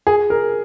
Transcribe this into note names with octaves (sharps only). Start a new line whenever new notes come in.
G#4
A#4